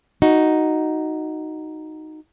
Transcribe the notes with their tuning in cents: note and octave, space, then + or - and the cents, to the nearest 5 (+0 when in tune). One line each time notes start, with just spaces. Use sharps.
D#4 +0 F#4 +0